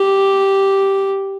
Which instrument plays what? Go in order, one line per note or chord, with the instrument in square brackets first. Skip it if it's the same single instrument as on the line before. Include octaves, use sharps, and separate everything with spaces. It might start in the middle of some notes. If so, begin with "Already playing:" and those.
Already playing: [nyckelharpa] G4